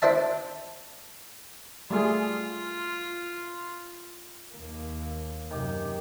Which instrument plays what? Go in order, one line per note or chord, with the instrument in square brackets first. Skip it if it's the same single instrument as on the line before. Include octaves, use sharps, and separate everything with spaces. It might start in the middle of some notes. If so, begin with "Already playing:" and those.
[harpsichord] D4 E4 C5 E5 A5
[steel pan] G3 A3 G#4 [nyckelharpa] F4
[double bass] D#2 A#3
[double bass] F#2 C3 [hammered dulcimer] D#3 G4